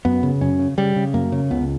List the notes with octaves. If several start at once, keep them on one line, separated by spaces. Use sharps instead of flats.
F#2 B3
C#3
F#2 C#4
C#3
C#3 G3
C#3
F#2 A#3
C#3
C#2 B3